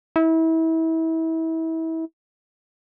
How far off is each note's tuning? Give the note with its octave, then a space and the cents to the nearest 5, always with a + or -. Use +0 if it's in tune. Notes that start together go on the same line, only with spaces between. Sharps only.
E4 -30